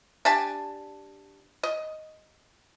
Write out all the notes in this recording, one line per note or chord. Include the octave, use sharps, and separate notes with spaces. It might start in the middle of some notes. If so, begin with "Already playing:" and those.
D4 G4 G#5 A5
D#5